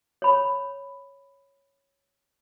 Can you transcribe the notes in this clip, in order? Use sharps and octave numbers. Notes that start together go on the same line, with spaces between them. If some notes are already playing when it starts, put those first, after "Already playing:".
C#5 B5